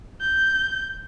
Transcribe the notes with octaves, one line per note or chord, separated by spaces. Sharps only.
G6